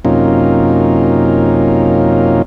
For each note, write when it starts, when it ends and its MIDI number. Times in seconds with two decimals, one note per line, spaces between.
0.05 2.42 42
0.05 2.42 48
0.05 2.42 58
0.05 2.42 61
0.05 2.42 63
0.05 2.42 65